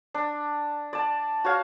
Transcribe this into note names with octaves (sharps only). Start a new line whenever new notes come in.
D4
D5 A5
F#4 C#5 F5